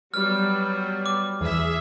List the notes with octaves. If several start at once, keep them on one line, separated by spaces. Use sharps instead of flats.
F#3 G3 B3 F6
D6
E2 G#4 E5